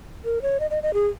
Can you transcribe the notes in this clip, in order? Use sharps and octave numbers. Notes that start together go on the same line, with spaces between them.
A#4
C#5
D#5
D#5
D#5
G#4